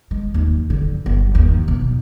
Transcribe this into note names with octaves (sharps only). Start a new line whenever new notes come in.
G#3
D#2
D3
G1
D#2
B2